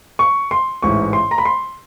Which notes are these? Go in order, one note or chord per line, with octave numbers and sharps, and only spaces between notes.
C#6
C6
A1 G#2 E3 C#6
C6
A#5
B5
C6